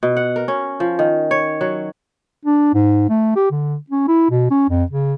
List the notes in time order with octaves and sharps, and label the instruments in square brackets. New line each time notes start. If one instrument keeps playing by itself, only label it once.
[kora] B2
F#5
A#4
C#4
F3
D#3
C#5
F#3
[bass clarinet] D4
G#2
A3
G4
D3
C#4
E4
B2
C#4
F2
C#3